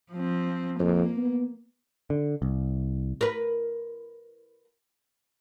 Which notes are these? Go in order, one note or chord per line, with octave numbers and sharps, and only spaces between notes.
F3 C4
F2 A#3
B3
D3
C2
A#4 B4